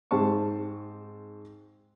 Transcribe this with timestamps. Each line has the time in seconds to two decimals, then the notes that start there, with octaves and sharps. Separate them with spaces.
0.11 G#2 C4 A5 C#6